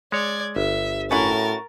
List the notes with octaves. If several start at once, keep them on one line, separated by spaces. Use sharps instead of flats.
G#3 C#5 D5 G#6
G1 E5
A2 C#4 E4 F#4 A#4 A6